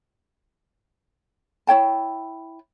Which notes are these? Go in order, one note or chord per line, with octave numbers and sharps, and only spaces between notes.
E4 C#5 G5 A5